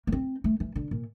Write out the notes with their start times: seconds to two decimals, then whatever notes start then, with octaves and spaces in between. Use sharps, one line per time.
0.07 A#3
0.12 C4
0.44 A3
0.60 E3
0.75 D3
0.91 A#2